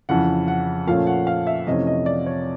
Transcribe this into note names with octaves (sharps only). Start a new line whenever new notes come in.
F2 C#3 E3 F#5
F#5
A#2 F3 A3 C#4 F5
F#5
F5
E5
F2 C3 E3 A3 C#4 D#5
D#5
D5
C#5